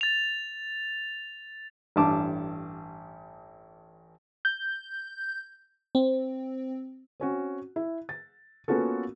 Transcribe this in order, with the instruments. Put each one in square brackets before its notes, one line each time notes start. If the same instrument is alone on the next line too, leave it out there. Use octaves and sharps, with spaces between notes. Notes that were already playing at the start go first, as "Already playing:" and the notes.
[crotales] A6 F7
[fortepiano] A1 G2 A5 D6
[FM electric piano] G6
C4
[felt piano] C4 C#4 F#4
E4
A6
A#3 B3 C#4 F4 F#4 A4